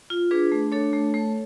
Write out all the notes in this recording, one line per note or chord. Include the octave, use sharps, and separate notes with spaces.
F4
D4 G#4 B4
A3
D4 A4 C#5
A3
A3